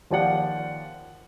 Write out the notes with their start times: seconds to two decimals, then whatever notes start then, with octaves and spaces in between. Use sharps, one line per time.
0.11 D#2 F3 G4 D5 F5 F#5